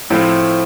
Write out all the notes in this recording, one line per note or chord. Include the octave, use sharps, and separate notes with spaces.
A2 F3 A3 C4 E4